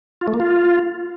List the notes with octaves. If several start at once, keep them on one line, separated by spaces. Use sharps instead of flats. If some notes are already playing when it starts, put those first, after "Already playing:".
F4
A3
A#3
F4